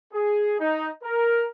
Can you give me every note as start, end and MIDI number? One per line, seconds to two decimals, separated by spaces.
0.13 0.55 68
0.60 0.88 63
1.04 1.45 70